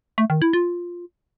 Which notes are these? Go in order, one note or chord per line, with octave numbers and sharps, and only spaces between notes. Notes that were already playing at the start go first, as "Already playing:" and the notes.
A3
D#3
E4
F4